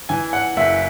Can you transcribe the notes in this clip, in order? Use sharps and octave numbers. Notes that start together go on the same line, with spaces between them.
E3 G#5
F#5
F#1 E5